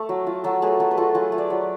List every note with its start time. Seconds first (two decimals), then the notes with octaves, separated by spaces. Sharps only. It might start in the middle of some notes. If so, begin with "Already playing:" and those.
Already playing: A3
0.09 F#3
0.27 F4
0.44 F#3 F#4 A4
0.62 A3 G#4 B4
0.79 F#3 F#4 A4
0.91 B4
0.97 F4 F#4 A4
1.15 F#3 F4 G#4
1.32 A3
1.38 B4 D5
1.50 F#3